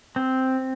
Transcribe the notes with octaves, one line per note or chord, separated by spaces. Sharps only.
C4